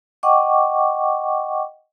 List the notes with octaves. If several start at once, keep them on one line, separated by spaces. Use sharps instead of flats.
D#5 F#5 G5 C#6 D6